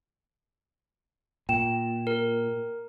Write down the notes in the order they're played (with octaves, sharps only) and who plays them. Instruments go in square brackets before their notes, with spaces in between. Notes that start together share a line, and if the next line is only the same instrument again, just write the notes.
[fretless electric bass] A#2 [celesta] G5 E7
[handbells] A#4